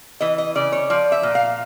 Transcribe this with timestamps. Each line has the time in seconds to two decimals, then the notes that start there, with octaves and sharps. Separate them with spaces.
0.21 E3 D#5
0.38 D#5
0.55 C#3 D5
0.72 C#5
0.90 F3 D5
1.12 E5
1.23 A#2
1.35 F5